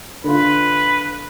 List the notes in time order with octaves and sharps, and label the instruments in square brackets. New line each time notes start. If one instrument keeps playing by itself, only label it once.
[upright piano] D3 F4 [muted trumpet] B4